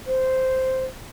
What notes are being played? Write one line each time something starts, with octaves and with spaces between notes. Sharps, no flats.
C5